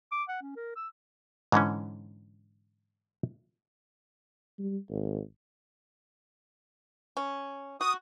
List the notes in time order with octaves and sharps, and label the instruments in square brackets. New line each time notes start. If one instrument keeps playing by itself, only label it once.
[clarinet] D6
F#5
C#4
A#4
E6
[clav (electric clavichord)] G#2 D3 E3 C#4
[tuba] G3
G#1
[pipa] C#4
[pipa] F#4 [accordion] D#6